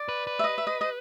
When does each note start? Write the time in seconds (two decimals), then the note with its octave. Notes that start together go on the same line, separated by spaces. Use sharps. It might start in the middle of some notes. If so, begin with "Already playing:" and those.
Already playing: D5
0.09 B4
0.27 B4
0.39 E5
0.44 D#5
0.58 E5
0.67 D#5
0.81 D#5